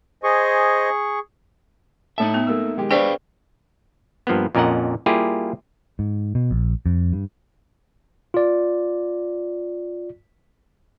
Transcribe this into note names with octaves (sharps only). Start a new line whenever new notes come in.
G#4 C5 D#5 G#5 C#6
A2 D#4 A4 E5 A5
B3
A3 A#3 E6
D#3 G#3 G4
D4 G#4 B4 C5 D5 F5 G5 C#6
G2 F3 A#3 B3
F2 A#2 C#4 A#4 D#5 F#5
G3 A#3 E4 F4 G4 G#4
G#2
B2
A#1
F2
G2
F4 D5